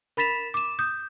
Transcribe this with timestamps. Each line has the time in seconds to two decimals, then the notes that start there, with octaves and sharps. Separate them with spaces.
0.17 A#4 B5 A6 B6 E7 F7
0.54 D6 E7
0.79 D#6 G6